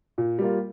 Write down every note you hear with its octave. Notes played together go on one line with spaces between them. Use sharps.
A#2
G3 A#3 F4